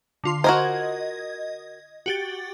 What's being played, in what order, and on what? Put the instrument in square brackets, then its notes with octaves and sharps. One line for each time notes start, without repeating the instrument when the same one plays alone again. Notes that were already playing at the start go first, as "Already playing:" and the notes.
[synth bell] D3 F4 C6
[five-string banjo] F#4 A#4 C5 [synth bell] D#5 G#6
[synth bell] F#4 G4 A6